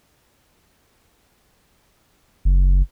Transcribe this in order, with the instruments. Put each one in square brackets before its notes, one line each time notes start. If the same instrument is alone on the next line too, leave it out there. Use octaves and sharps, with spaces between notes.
[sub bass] F#1